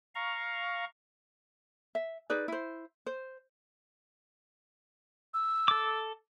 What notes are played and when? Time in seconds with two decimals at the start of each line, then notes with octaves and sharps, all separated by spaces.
0.15 F5 A#5 C#6
1.95 E5
2.30 D#4 G#4 B4 D5
2.48 E4 C5
3.06 C5
5.34 E6
5.68 A4 D6